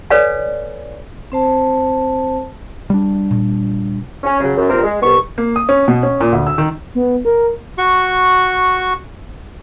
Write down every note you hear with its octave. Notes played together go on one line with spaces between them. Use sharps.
A4 B4 C#5 D5 F5 G#5
C4 C5 A5
G3 D4
A#2
C#4
C#3 F#3
F#2
G2 A#2 C4 A#4
G#3
C2 B3 C#6
A#3
D#6
C#4
B2
C#4
A#2
D2
E6
D#3
B3
A#4
F#4 C#6